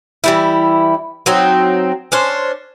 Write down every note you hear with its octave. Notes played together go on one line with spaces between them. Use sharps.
E3 G3 E4
F#3 C4 D#4
C#4 D4 C5